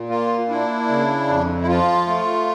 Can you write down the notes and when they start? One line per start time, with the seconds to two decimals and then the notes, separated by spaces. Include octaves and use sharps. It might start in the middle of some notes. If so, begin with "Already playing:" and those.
Already playing: A#2
0.09 A#3 F4
0.49 D4 E4
0.88 C#3
1.28 F2
1.61 E4
1.67 F3 F4
2.07 A3